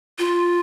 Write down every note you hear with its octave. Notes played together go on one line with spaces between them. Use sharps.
F4